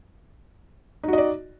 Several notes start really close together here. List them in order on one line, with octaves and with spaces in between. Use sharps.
D#4 F#4 D#5 D5